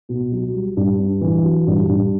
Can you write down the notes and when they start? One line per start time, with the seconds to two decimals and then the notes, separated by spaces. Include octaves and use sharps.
0.09 B2
0.32 F#3
0.53 G3
0.77 G2
0.99 D4
1.21 E3
1.44 F#3
1.67 G2
1.89 G2